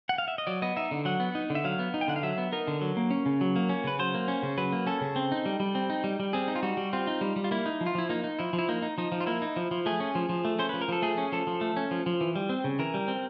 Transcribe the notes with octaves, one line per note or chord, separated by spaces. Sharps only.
F#5
F5
E5
D#5
F#3 D5
B3 D#5
D#4 E5
D3
F#3 F#5
B3
D#4
D3
E5
F#3 F5
B3
D#4
G5
D3 F#5
F5
F#3 E5
B3
D#4 A#4
D3
F#3
A#3
C#4
C#3
F#3
A#3
C#4
C#3 B4
F#3 C5
A#3
C#4
C#3
F#3 B4
A#3
C#4 A4
C#3
C4
D#4
G3
G3
C4
D#4
G3
G3
C4 G#4
D#4
F4
G3 F#4
G3
C4 F4
D#4
G3
G3
F4
A#3 E4
D#4
F3
F4
F3 E4
A#3 D#4
D#4
F3 E4
F3
E4
A#3 D#4
D#4
F3 D#4
F3
F4
A#3 E4
D#4
F3
F3
A3 G#4
C#4
F3
F3
A3
C#4 C5
F3 B4
A#4
F3 A4
A3 G#4
C#4
F3 A4
F3
A3
C#4
F3
F3
E3
G3
C4
C#3
E3 A#4
G3
C4